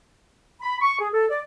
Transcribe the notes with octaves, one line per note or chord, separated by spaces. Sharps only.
B5
C#6
G#4
A4
D5